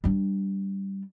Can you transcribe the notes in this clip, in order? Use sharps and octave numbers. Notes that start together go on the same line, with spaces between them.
G3 D4